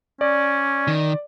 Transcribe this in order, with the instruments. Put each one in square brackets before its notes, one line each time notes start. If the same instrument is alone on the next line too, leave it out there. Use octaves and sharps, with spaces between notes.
[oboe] C#4 [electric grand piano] D5
[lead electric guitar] D#3